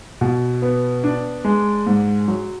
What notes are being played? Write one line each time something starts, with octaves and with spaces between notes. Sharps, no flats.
B2
B3
D4
G#3
G#2
F#3